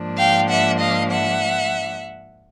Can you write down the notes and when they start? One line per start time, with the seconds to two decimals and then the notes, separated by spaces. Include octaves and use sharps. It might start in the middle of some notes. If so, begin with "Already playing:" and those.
Already playing: G#2 F3 A#3 D4
0.17 F5 G5
0.48 E5 F#5
0.80 D#5 F5
1.11 E5 F#5